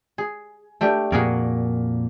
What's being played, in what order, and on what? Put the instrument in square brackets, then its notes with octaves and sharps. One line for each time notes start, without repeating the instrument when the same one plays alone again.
[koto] G#4
A3 D4 G4
[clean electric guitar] F2 A#2 [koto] F#4 G#4 A#4